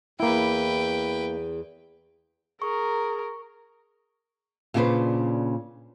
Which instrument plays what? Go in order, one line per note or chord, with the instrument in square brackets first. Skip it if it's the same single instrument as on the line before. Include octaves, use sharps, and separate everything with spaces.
[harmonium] E2 [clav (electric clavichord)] A#3 E4 [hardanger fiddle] B4 G5
[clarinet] G#4 [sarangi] A#4 [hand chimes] C#6
[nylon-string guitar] A#2 C#3 D4 G#4 B4 C5